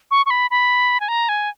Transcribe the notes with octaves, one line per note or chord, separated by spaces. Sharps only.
C#6
C#6
B5
B5
G#5
A#5
G#5